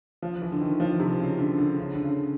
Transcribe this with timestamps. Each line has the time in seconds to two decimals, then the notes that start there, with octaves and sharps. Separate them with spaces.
0.22 F3
0.42 E3
0.52 D3
0.61 D#3
0.80 F3
1.00 C3
1.20 C#3
1.39 D3
1.58 D3
1.78 C#3
1.93 D3
2.04 C#3